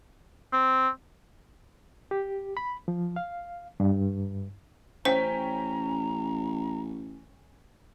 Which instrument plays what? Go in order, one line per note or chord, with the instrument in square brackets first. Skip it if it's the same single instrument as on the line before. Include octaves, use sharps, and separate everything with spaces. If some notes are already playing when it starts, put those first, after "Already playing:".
[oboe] C4
[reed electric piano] G4
B5
F3
F5
G2
[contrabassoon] A1 [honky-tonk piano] C#4 G5 B6 [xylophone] C5 [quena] A#5